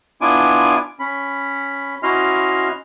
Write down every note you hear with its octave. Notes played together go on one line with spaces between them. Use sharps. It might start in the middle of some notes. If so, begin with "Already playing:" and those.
B3 D4 E4 F4 G#5 D6
C#4 B5
C#4 E4 F#4 D#5 C6 F6